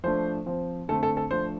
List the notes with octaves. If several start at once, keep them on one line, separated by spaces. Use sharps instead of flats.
F3 A3 D4 C5
F3 C4
D3 A3 C4 A4
A4
A4
F3 A3 D4 C5